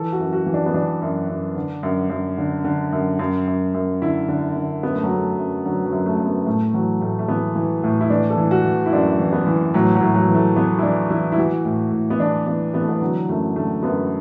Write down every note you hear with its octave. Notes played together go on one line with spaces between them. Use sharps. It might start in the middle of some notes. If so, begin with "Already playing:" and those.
Already playing: E3 A4
F#4
F#2
F#4
E3
D4
B3
E3 D4
F#2
F#2
D3
F#2
F#2
D3
D3
F#2
F#2
F#2
F#2
D3 E4
D3
D3
F#2 B3
A3
F#3
F#2 A3
F#2
D3 F#3
F#3
F#2
A3
F#2
B3
A2 A3
E3 F#3
A2 A3
A3
E3 B3
E3
A2
E4
E3 D4
A4
E3
F#4
E3
E4
F#2 D4
E3
B3
E3
A2 F#3
F#3
A2
F#3
E3
A3
E3 B3
E4
E3 D4
E3 E4
E4
E3 F#4
A2
A2
B3
E3 D4
E3 B3
E3 B3
A3
B3
D3 F#3
F#2 A3
D3 A3
F#2 B3